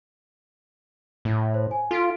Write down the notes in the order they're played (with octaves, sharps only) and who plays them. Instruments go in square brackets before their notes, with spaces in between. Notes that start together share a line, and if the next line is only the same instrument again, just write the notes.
[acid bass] A2
[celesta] C5
G#5
[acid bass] F4 [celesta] A4 B6 D7